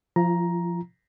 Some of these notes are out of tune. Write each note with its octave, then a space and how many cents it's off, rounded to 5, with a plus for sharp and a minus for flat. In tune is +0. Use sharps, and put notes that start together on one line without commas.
F3 +0 F4 -40 A#5 +10